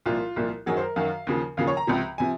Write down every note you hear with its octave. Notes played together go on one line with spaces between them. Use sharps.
C2 A#2 F3 F4
C2 A#2 F3
F#2 D#3 F#3 G#4
C5
A#4
F#2 D#3 F#3 F5
D#2 C#3 F3
D#2 C#3 F3 F5
C#5
A#5
C#2 C3 F3
C3 F3 G#5